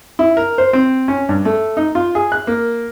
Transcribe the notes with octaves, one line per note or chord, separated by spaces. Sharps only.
E4
A#4
C5
C4
C#4
G2
A3
D#4
F4
G#4
F#6
A#3